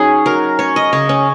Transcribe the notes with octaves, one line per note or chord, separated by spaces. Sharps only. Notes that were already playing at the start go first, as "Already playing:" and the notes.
Already playing: F#3 C#4 D#4 G#4
F#3 A#4
C#4 C#5
D#5
C#3 C#5
C#4